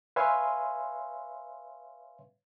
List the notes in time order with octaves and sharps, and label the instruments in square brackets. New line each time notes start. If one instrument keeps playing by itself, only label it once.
[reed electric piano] B4 C#5 E5 F5 G#5 C6